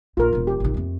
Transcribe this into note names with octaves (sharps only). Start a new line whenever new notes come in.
A#1 F4 A#4
E1 F3
G4
A1 D#3
F2 A3